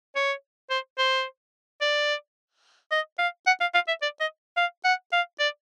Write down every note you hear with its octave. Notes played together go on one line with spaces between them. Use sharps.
C#5
C5
C5
D5
D#5
F5
F#5
F5
F5
E5
D5
D#5
F5
F#5
F5
D5